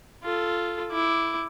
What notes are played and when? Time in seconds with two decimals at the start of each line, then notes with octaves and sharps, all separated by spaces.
0.23 F4 A4
0.92 E4 D6